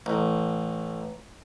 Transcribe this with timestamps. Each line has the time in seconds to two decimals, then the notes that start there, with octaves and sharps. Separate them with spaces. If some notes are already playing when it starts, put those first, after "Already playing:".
0.06 A1